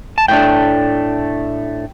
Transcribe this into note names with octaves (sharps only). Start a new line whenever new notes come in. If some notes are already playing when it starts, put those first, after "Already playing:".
A5
A2 A3 D4 G5